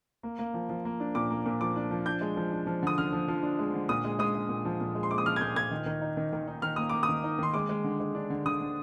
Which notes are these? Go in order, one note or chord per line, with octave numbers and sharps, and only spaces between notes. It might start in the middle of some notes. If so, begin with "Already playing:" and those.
A#3
A#3
F3
F3
A#3
D4
A#2 D6
A#3
A#2
F3 D6
D4
F3
D4 G6
G#3
F3
D4
F3
D3 D#6
D3 F6
F3
F3
D4
G#3
D3
A#2 D#6
G#3
G#3 D#6
G#3
A#2
F3
A#2
G#3
C6
G#3 D6
D#6
F3 F6
G#6
A#2 G6
A#2 G#6
D#3
D#3
D#4
D#3
D#3
D#4
D#3 F6
A#3 D#6
A#3 D6
D#6
D#3
D#4
D#3 C6
G#3 D6
G#3
D3
G#3
D4
D3
D3 D#6
D3